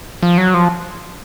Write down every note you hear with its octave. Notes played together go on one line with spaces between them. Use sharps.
F3
F#3
F3